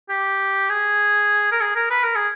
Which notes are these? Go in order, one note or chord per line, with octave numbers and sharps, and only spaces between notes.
G4
G#4
A#4
G#4
A#4
B4
A#4
G#4